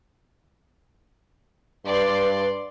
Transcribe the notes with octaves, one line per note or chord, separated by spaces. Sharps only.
G2 B4 D5 C6